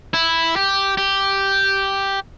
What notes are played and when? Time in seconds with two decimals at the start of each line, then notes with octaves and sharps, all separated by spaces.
0.14 E4
0.56 G4
0.98 G4